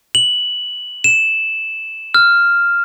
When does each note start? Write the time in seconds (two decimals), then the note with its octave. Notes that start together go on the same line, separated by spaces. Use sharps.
0.15 F#7
1.04 E7
2.14 F6